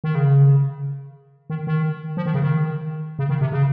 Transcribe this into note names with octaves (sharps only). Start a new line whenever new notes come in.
D#3
C#3
D#3
D#3
F3
D#3
C#3
D#3
C#3
D#3
C3
C#3